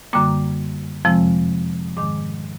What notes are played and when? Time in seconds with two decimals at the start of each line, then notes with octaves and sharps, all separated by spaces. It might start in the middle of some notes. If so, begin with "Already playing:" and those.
0.13 F#2 D3 G3 A#3 D6
1.05 F2 C3 F3 G#3 C4
1.97 G#2 D#3 G#3 D6